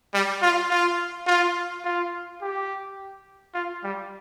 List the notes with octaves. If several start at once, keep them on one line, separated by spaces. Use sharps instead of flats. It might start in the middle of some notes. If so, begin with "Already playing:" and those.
G3
F4
F4
F4
F4
G4
F4
G3